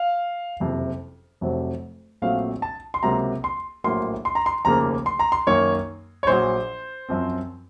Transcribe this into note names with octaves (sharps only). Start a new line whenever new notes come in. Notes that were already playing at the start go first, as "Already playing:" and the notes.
Already playing: F5
F#1 F2 C3 F3
F1 F2 C3 F#3
A#1 A#2 F#3 A3 C4 F5
A5
C6
C#2 C3 F#3 A#3 A#5
C6
A#1 A2 F#3 A#3 C6
C6
A#5
C6
F1 D#2 C#3 F3 A#3 A#5
C6
A#5
C6
F#2 D#3 A#3 C#5
C#5
A#1 A#2 F#3 C5
F#2 F3 C4